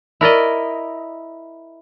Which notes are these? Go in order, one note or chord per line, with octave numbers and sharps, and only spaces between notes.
E4 A#4 D5 D#5